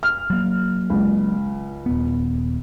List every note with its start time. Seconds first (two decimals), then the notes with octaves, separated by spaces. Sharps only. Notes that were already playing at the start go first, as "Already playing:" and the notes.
0.03 F6
0.30 F#3 A#3
0.90 C#2
1.86 D#1 B3